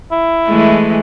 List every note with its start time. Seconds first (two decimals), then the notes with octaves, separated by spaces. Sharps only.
0.12 E4
0.47 E3 G#3 A3